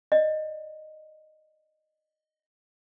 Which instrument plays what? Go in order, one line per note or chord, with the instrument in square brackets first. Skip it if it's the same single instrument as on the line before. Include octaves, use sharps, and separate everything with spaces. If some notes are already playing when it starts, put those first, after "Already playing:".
[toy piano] D5 D#5